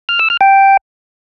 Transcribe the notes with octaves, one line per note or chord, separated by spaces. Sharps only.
F6
E6
F6
G5